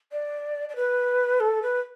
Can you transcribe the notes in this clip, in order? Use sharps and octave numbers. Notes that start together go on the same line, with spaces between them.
D5
D5
B4
A4
B4